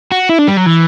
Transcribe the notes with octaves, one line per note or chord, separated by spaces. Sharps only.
F#4
E4
D4
G3
F#3
E3